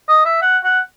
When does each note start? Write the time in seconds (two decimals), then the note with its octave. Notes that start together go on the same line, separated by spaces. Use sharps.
0.09 D#5
0.25 E5
0.42 F#5
0.64 F#5